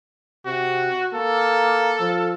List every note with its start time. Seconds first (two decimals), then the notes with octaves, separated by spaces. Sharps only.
0.46 C3 F#4
1.14 A#3 A4
2.00 F3